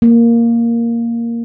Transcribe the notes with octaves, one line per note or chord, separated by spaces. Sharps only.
A#3